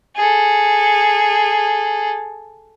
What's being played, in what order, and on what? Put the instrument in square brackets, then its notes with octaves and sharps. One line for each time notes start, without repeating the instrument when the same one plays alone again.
[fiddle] G#4 A4